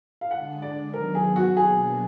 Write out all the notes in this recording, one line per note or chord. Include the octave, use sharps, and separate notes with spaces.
F5
D3 G#3 D4 F#5
D5
D#3 F#3 B3 A#4
G#4
F#4
B2 F#3 A#3 D4 G#4